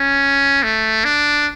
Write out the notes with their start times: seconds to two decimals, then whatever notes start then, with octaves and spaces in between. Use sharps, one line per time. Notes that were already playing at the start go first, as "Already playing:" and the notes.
Already playing: C#4
0.63 A3
1.05 D4